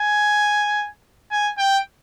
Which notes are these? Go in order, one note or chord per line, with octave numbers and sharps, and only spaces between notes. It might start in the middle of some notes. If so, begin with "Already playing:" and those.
Already playing: G#5
G#5
G5